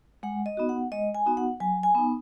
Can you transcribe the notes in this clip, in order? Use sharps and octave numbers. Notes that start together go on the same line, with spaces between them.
G#3 F#5
D#5
B3 D#4 F#4
F#5
G#3 D#5
G#5
B3 D#4 F#4
F#5
F#3 G#5
G#5
B3 D#4